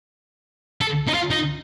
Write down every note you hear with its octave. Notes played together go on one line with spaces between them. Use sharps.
A4
D#4
F4
D#4